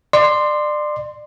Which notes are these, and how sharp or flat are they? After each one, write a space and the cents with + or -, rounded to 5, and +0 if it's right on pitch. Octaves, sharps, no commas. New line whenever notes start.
D5 +30 C6 -5